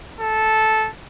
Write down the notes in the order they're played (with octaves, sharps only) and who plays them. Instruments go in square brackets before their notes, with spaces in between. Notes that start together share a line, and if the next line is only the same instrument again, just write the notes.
[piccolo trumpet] A4